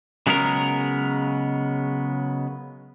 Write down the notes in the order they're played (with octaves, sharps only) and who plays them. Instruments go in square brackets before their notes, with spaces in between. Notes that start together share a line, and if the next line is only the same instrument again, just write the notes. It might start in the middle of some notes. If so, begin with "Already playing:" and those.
[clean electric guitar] C#3 F#3 G#3 B3 A4 A#4